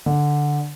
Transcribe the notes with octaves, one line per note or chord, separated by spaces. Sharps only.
D3